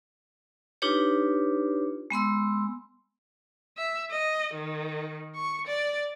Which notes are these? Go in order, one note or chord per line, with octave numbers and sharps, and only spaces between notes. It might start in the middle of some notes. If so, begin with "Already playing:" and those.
D4 D#4 F4 G4 B4 C#5
G#3 B3 C6 E6
E5
D#5
D#3
C#6
D5